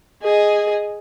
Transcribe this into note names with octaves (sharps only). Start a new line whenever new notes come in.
G#4 D#5